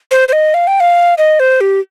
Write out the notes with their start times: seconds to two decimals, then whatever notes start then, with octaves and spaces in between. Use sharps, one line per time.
0.11 C5
0.28 C5
0.33 D#5
0.54 F5
0.67 G5
0.80 F5
1.18 D#5
1.40 C5
1.61 G4